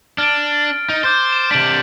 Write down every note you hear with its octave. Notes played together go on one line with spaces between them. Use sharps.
D4 F6 A6 D7
D#4
C5 D6 G6 A6
E7
C3 D4 B6 D7 F#7